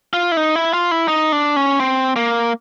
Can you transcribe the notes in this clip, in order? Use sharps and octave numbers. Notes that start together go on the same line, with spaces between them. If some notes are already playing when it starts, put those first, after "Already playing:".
F4
E4
D#4
E4
F4
E4
D#4
D4
C#4
C4
A#3